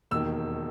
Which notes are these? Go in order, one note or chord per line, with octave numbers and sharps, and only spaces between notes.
E1 D#2 D#3 E6